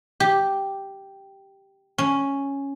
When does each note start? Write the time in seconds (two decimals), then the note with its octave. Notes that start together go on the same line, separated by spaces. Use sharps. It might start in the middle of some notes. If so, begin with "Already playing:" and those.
0.20 G4
1.98 C#4